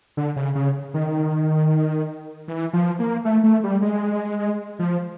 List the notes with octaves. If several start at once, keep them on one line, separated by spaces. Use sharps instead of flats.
D3
C#3
C#3
D#3
E3
F3
A#3
A3
A3
G3
G#3
F3